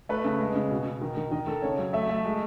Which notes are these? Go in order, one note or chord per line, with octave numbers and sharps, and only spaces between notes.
A3 B4
C#3
G#3
C#3
B2
B2
D#3
D#3
D#3 D#5
D#3 A4
C#3 C#5
F#3
A3 E5
A3
G#3